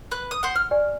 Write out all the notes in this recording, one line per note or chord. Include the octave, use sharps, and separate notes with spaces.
B4 F#6
D#6
C5 F#5
A4 F6
G4 D5 G#5